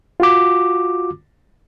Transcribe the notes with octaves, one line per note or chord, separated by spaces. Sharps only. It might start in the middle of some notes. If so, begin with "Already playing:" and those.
F4 F#4 D6